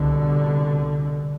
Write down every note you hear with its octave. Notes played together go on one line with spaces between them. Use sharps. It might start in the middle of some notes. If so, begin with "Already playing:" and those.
Already playing: C2 B2 D3